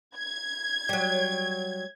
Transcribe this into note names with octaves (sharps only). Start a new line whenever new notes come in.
G#6
F#3 G3